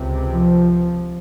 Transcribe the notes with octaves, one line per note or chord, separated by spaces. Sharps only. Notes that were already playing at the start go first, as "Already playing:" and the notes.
Already playing: C#2 C3
F3